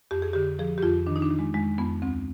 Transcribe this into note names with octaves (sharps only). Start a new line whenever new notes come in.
F2 G4
G#4
D3 G4
F3 G#4
G4
F2 F4
D#3 D4
D#4
D4
D#3
G#3
F2 G#3
F2 B3
D2 C4